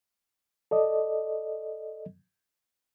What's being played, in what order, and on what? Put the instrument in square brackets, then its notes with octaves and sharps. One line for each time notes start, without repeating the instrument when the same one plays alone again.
[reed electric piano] A4 D5 D#5